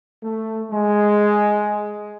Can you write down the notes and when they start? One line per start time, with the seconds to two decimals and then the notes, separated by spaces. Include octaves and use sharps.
0.23 A3
0.72 G#3